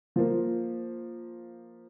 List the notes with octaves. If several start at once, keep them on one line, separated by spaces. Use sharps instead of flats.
F3 A#3